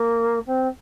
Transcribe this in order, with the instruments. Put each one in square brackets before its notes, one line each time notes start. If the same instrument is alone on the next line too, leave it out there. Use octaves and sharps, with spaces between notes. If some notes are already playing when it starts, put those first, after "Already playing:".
Already playing: [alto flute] A#3
C4